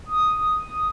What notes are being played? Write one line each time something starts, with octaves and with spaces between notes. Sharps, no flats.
D#6